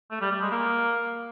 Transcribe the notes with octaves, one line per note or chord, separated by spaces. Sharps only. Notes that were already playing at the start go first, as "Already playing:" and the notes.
A3
G3
G3
G#3
A#3